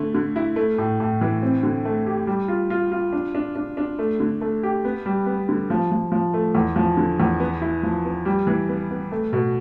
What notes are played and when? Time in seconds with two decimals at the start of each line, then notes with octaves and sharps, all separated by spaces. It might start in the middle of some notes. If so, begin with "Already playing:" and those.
Already playing: D3 A3
0.15 D3
0.36 E4
0.56 A3
0.78 A2
1.00 A2
1.21 E3
1.42 C4
1.63 D3
1.85 A3
2.06 G4
2.27 G3
2.48 F4
2.70 F4
2.92 F4
3.13 D4
3.35 D4
3.55 D4
3.77 D4
3.99 A3
4.20 D3
4.41 A3
4.63 G4
4.85 B3
5.06 G3
5.26 B3
5.49 D3
5.70 F3
5.92 F3
6.12 F3
6.34 A3
6.55 E2
6.76 F3
6.97 D3
7.20 E2
7.40 B3
7.61 E4
7.83 F3
8.05 B3
8.25 G3
8.47 E3
8.69 B3
8.91 B3
9.12 A3
9.33 B2